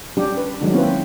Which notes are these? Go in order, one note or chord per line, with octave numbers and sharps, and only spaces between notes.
G3 C#4 D4 G4
B4
D#3 F#3 G#3 D4
A#3 C4 C#4 E4 B4